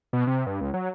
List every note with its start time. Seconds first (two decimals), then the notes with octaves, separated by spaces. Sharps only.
0.13 B2
0.27 C3
0.47 G2
0.61 C#2
0.74 F#3